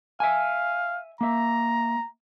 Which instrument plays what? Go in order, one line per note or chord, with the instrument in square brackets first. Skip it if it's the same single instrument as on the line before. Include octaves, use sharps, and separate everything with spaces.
[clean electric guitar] E5 G#5 [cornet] F5
[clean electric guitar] A#3 E5 [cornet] A#5